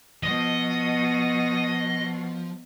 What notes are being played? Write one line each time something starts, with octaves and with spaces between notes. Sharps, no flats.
B2 F3 D#5